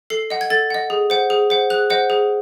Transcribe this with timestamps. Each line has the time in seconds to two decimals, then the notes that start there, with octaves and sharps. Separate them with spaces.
0.10 A4 C7
0.30 D#5 F#5
0.41 G#6
0.50 A4 A6
0.70 D#5 F#5
0.90 G#4
1.10 C5 F#5
1.30 G#4
1.50 C5 F#5
1.70 G#4 F#6
1.90 C5 D#5 F#5
2.10 G#4